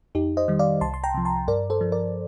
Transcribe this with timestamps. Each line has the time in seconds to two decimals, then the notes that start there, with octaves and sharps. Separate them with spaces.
0.15 F2 D#4 G4
0.37 C5 D#5
0.48 D#3 G3
0.59 D5 F5
0.81 C2 A5 C6
0.94 C6
1.04 G5 A#5
1.14 C3 F3
1.25 A5 C6
1.48 G2 A#4 D5
1.70 A4 C5
1.81 F3
1.92 A#4 D5